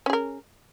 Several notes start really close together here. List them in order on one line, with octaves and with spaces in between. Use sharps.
C#4 G#4 A#4